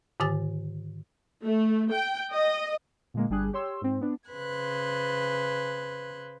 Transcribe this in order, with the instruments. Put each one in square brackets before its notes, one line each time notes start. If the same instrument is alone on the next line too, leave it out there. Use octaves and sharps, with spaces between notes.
[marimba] G#2 D3 D#3 G4 G#5 A6
[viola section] A3
G5
D#5
[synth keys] A#2 D3 G#3 A#3
G1 G3 D4 G#4 F#6
G4 C#5 C6 E6
G#2 C4
B3 D4
[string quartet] C#3 B4 C5 F#6 G#6